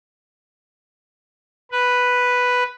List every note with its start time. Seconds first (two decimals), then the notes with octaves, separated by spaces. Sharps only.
1.71 B4